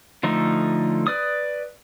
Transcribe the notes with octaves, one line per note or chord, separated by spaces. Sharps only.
D3 F3 A3 D#4
B4 D5 D#6